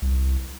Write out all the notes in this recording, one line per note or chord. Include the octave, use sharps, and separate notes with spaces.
C2